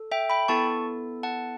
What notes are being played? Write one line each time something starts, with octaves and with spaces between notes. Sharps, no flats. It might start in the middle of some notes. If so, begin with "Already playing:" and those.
Already playing: A4
E5 G5
G5 B5
B3 E4 A4 A5 C#6
F#5 A5